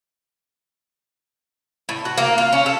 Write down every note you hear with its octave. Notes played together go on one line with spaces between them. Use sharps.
A2
F#4
A#3
F4
C#4
A4